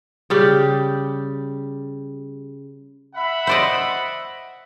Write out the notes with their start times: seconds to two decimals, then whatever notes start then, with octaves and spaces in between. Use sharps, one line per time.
0.30 C#3 G3 G4
3.15 E5 F#5 B5
3.47 C5 D5 D#5